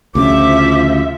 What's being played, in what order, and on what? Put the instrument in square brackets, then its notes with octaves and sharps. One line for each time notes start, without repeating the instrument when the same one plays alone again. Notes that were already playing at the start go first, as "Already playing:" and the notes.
[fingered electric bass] D2 C#3 [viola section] F3 E5 [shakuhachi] D6